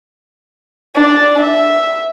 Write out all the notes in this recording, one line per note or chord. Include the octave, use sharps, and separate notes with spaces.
D4 D5
E5